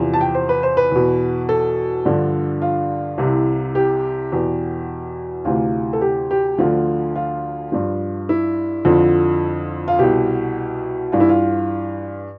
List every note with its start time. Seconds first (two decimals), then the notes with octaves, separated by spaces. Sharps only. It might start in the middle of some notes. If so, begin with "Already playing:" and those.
Already playing: E2 C3 F3
0.14 A5
0.21 G5
0.35 C5
0.49 B4
0.63 C5
0.77 B4
0.91 E2 B2
1.49 A4
2.05 G2 D3 F3
2.62 F4
3.18 C2 C3 E3
3.75 G4
4.32 E2 B2
5.45 D2 C3 E3 F4
5.93 A4
6.01 G4
6.31 G4
6.58 D2 D3 F3 F4
7.16 F4
7.72 G2 F3
8.29 E4
8.85 F2 D3 F3
9.88 F4
9.99 C2 B2 G4
11.12 G2 E3 F4
11.20 E4
11.29 F4